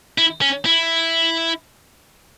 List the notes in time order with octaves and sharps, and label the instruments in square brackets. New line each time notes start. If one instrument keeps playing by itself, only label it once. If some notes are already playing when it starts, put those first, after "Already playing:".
[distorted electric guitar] E4
C#4
E4